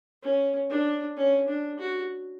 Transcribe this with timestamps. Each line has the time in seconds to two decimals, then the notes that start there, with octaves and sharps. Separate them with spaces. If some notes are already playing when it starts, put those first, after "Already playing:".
0.23 C#4
0.70 D4
1.17 C#4
1.48 D4
1.79 F#4